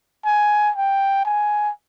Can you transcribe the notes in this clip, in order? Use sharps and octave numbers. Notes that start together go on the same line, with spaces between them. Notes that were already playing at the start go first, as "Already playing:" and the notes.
G#5
G5
G#5